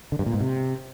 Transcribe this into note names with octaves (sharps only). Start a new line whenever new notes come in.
D3
G2
A#2
G#2
C3